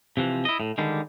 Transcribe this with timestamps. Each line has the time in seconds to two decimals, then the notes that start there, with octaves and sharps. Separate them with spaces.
0.17 C3 E3 F3
0.45 E4 D#5
0.60 A2
0.78 D3 D#3 G3 G#3